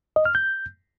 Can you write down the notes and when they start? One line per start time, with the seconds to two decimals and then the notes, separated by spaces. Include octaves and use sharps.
0.16 D#5
0.25 F6
0.35 G6